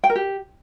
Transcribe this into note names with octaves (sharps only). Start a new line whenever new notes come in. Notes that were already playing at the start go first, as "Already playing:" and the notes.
G5
A#4
G4